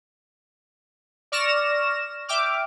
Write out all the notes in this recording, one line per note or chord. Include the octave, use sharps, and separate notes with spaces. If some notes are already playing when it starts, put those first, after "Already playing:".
D5 C#6 F6 A#6 E7
E5 G5 D6 F6